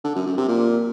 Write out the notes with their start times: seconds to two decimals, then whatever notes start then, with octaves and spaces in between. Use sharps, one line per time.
0.04 D3
0.15 F#2
0.26 F#2
0.37 C3
0.49 A#2